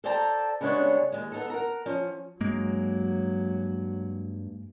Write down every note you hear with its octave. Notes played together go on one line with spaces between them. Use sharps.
A4 C5 D5 G5 A5 A#5
C#3 G3 G#3 B3 D4 C#5
D#2 G#2 G#3
B3 D#4 A4
A#4 F#5 A#5
F3 C#4
G2 F#3 G#3 A#3